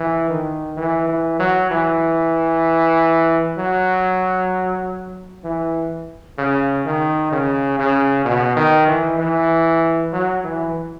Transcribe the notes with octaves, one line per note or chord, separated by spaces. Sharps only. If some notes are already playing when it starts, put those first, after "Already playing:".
Already playing: E3
D#3
E3
E3
F#3
E3
F#3
E3
C#3
D#3
C#3
C#3
B2
D#3
E3
E3
F#3
E3